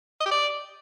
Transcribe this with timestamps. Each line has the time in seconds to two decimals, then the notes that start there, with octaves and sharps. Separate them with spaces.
0.20 D#5
0.26 G4
0.31 D5